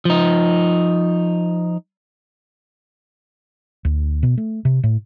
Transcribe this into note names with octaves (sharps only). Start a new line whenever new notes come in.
F3 D#4
D2
B2
A3
C3
A2